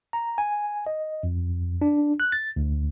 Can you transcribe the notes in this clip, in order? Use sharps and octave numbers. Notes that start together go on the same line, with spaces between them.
A#5
G#5
D#5
F2
D4
F#6
A6
D2